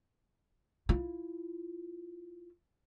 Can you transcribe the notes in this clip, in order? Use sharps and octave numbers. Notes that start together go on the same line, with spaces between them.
E4 F4